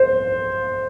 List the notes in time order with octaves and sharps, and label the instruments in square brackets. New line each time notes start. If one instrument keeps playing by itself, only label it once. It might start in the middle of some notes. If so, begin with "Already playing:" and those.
Already playing: [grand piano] C5